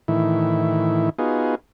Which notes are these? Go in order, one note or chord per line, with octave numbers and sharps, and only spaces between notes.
A2 D#3 E3 E4
B3 D#4 F4 F#4 G#4